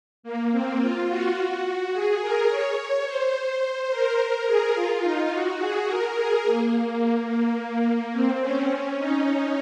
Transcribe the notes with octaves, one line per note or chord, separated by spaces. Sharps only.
A#3
C4
F4
F#4
G#4
A#4
C#5
C5
A#4
A#4
G#4
F4
D#4
F#4
G#4
A#4
G#4
A#3
A#3
C4
C#4
D#4